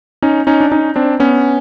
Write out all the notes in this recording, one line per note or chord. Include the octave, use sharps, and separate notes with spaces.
C#4 D#4
C#4 D#4
D4
C#4 D#4
C4 D4
B3 C#4